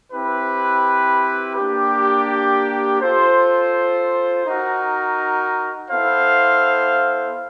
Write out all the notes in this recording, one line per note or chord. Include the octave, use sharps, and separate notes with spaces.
C4 E4 G4 B4
A#3 D4 G4
F4 A4 C5
D#4 F#4 A#4
B3 E4 A4 C5 F5